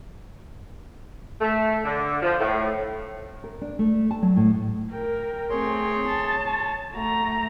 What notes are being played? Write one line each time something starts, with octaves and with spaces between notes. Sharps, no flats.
A3
D3
F3
A2
A#4
D4
A3
A5
F#3
A2
A#4 G5
A3 C4 G#4 C#5 C6
A5
C#5
A3 F#4 A#5